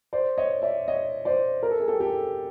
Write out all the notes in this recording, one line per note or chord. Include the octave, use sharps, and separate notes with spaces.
C5 D5
C#5 D#5
D5 E5
C#5 D#5
C5 D5
A#4
A4
G#4
G4 A4
G4 A4